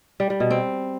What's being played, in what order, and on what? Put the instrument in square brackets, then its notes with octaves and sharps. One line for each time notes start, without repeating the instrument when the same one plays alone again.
[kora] G3
G3
B2
C4